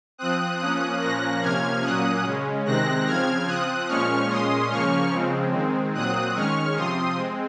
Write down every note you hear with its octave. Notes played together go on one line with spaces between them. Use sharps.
F3 C4 D#6 F#6
F3 A#3 C#4 D#6 F#6
A#2 F3 A#3 C#4 F#6 A#6
C3 F3 A#3 C#4 F6 G#6
A#2 F#3 A#3 C#4 D#6 F#6
C#3 G#3 C#4
C3 D#3 G#3 C4 F#6 A#6
C#3 F3 C4 F6 G#6
F3 C4 D#6 F#6
A#2 F3 G#3 C#4 C#6 F6
A#2 G#3 C#4 C6 D#6
C#3 F3 A#3 C#4 C#6 F6
C#3 F3 G#3 C4
D#3 G#3 C4
A#2 F#3 C4 D#6 F#6
D#3 G#3 C#4 C#6 F6
C3 F3 C4 C6 D#6
G#3 C4